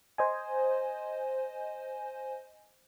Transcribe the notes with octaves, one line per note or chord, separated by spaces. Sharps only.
C5 D#5 G#5